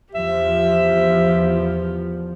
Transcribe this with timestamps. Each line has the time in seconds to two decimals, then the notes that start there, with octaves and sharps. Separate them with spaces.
0.14 E2 F3 G4 E5